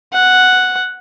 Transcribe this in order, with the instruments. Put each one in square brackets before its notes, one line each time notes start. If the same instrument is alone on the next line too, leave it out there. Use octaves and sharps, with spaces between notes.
[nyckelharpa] F#5